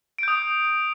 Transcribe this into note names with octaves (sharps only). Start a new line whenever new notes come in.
D#6 G6 D7